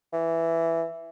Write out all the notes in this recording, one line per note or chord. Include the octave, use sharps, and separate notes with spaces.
E3